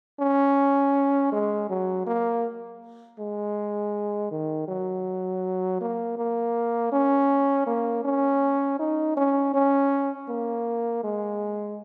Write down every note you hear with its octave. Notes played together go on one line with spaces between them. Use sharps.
C#4
G#3
F#3
A#3
G#3
D#3
F#3
A#3
A#3
C#4
A#3
C#4
D#4
C#4
C#4
A#3
G#3